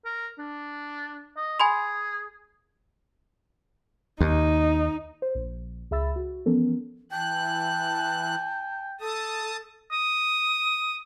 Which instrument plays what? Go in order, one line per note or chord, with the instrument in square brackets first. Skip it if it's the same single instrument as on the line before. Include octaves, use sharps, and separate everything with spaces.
[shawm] A#4
D4
D#5
[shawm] G#4 [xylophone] G#5 B5 C6
[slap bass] D#2 [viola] D#4
[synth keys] C5
A#1
C#2 G#4 E5 B5 E6 A6
F#4
E3 F3 B3 C#4 A4 A#4
[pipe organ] E3 F#6 [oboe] G5 [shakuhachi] A5
[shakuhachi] A4 [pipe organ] A5 D#6
[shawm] D#6